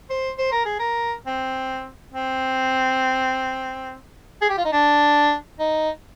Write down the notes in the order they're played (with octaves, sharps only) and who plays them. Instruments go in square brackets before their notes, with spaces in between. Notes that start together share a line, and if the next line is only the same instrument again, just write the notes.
[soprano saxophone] C5
C5
A#4
G#4
A#4
C4
C4
G#4
G4
F4
D#4
D4
D#4